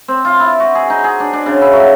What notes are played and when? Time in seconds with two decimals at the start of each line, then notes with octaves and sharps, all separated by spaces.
0.08 C4
0.25 F4
0.40 E4
0.60 F#4
0.75 G#4
0.90 D#4
1.04 G#4
1.20 D4
1.33 D4
1.46 C#3
1.62 E4
1.73 F#3